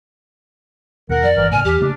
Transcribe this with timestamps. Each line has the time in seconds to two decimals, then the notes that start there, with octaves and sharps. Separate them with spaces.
1.09 D#2 B2 A#4 F#5
1.23 F2 D5
1.36 G1 E3 A#4
1.51 A2 C#3 G#5 F6
1.65 E2 G4
1.81 C#3 A3 B3 D4